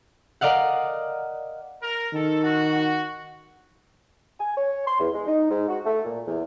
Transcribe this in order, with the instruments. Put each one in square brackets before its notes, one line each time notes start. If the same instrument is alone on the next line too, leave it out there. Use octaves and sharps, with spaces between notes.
[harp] A#4 D5 D#5 F5 F#5
[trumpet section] A#4
[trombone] D#3 [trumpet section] A4
[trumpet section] F#4
[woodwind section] G#5
C#5
C6
E2
G#3
D#4
G#2
F#4
A3
A#2
E2